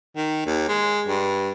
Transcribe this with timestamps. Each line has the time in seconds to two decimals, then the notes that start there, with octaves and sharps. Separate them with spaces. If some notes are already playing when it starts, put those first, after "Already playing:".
0.16 D#3
0.46 D#2
0.68 G#3
1.07 G2